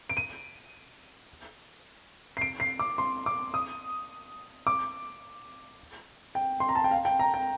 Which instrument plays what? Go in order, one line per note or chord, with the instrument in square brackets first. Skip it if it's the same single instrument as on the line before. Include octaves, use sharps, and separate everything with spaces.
[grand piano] D7
D#7
C7
D7
C7
D6
C6
D6
D#6
D6
G5
C6
A#5
A5
G5
F5
G5
A#5
G5